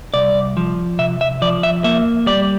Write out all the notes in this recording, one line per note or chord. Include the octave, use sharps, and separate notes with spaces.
C2 D5
F3
C3 E5
E5
F3 D5
E5
A#3 E5
G3 D5